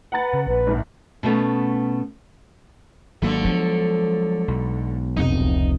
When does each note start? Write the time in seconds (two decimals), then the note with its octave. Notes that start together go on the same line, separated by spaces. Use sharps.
0.12 B4 F#5 A#5 A6
0.34 C#3
0.47 A#1 A#2 B4
0.67 C2 G#2
1.23 B2 A3 B3 C#4
3.22 G#1 D3 F#3 A3 A#3
3.44 F3 F#3 G#3 B3
4.48 B1
5.16 F1 C#2 D#4